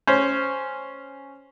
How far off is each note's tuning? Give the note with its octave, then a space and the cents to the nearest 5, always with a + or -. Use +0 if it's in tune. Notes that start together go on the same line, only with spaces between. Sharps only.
C#4 +0 C5 +0